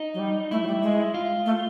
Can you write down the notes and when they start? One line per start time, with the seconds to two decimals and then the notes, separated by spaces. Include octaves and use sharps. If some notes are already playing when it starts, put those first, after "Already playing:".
Already playing: D#4
0.14 F#3
0.19 G3
0.51 A3 E4
0.63 F#3
0.67 G3
0.83 G#3
1.14 F4
1.46 A3